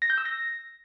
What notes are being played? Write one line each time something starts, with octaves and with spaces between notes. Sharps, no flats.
A#6
G6
E6
A#6